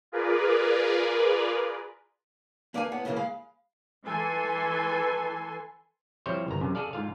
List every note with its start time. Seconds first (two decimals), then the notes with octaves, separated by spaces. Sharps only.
0.12 F4 G#4 A#4 B4 D5
2.74 A#3 B4 D5 F5 F#5 G#5
2.92 A2 B3 F#5
3.05 A2 C#3 E3 G3 A#3
3.16 G#3 F5 B5
4.06 E3 A4 B4 G#5 C6
6.26 F3 G3 C4 E4 C5 C#5
6.48 G1 C2 A#5
6.60 F#2 C3
6.75 G#4 A4 D5 F5
6.93 G#2 F4 F5